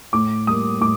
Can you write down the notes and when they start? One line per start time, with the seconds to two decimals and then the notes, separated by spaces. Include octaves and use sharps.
0.13 A2 D6
0.47 G3 A#3 D#6
0.81 A2 D6